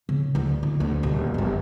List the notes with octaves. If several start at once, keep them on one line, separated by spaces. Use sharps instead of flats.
C#3
D2 E4
D2
D2
D#1 B2
G1 F#2